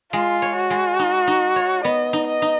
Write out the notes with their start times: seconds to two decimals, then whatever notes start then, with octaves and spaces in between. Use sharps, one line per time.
0.13 G#3 F4
0.42 C#5
0.57 F#4
0.70 G#3
0.99 D#4
1.27 D#4
1.56 C#5
1.84 B3 D#5
2.13 D#4
2.27 D#5
2.42 D#4